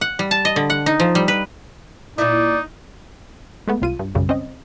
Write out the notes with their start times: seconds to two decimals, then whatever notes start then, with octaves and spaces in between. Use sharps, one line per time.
0.01 F#5
0.19 G3
0.31 A5
0.45 D#5
0.56 D3
0.70 F#5
0.86 D#4
1.00 F3
1.15 G3
1.28 B4
2.18 A#2 D#4 E4 D5
3.68 G#3 A3 B3
3.82 C2 F4 D#7
3.99 G2
4.15 B1 F#2 C#3 G3
4.29 C4 C#4 D#5